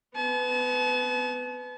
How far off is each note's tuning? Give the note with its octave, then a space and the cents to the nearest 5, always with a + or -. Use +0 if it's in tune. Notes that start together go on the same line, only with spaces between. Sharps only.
B3 +20 A5 -40